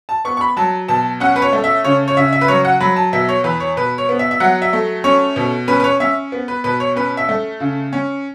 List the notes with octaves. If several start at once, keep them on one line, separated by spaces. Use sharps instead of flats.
A5
B3 C#6
C#6
B5
F#3 A5
B2 A5
C#4 F#5
B4
C#5
A3
E5
C#3 C#5
C#5
C#3 E5
E5
B4
F#3 C#5
F#5
F#3 B5
A5
B2 E5
C#5
E2 B4
C#5
B2 B4
C#5
B3
E5
E5
F#3 F#5
E5
A3
C#4 C#5
B2
C#4 B4
B4
C#5
C#4 E5
B3
B4
B2 B4
C#5
C#4 B4
E5
A3
C#3
C#4